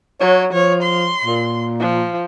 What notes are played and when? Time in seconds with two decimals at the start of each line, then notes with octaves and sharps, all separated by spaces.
0.20 F#3 C#5
0.53 F3 C#5
0.83 C6
1.25 A#2
1.80 F3